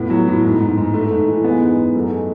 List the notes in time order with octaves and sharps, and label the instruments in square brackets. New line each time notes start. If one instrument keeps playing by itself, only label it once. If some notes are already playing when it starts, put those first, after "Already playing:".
Already playing: [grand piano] A2 B3
F#3
A2
G#2
G#2
G#2
G#2 A3
G#2
E3
G#3 B3
G#2
G#2
F#2 A3
G#3